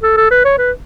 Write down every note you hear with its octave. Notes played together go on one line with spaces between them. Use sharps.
A4
A4
B4
C#5
B4